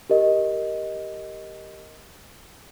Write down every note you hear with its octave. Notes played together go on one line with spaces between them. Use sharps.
G4 A#4 D#5